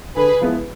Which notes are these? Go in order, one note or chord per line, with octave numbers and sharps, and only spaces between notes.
D3 G#4 B4
F3 G#3 B3 E4